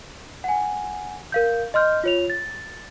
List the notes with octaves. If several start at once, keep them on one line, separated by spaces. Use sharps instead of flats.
F#5 G#5
A#4 F5 G6
D#5 C6 F6 G6
F4 C#5 F7
A6